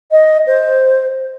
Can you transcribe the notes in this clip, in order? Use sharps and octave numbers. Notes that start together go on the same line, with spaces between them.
D#5
C5